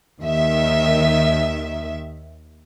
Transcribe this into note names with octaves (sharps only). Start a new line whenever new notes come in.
D#2 D#3 E5